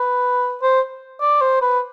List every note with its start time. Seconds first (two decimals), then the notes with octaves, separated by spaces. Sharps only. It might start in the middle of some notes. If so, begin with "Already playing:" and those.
Already playing: B4
0.62 C5
1.21 D5
1.41 C5
1.62 B4